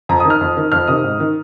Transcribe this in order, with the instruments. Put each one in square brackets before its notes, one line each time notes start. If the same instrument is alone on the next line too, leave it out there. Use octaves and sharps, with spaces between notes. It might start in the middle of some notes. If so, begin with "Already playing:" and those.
[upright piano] F2 A#5
D#6
D#3
F6
F2
D#3
F2 F6
C3 D#3 D#6
G#2
D#3